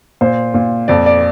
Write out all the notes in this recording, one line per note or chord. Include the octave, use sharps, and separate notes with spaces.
A#2 C5
A#2
F2 D5
D5